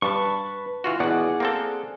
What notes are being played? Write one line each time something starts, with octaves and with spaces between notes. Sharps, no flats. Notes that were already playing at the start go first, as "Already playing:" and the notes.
G2 B4 A5 C#6
E3 F4 F#4
E2 B2 G#4 D5 F#5
A#3 C4 A4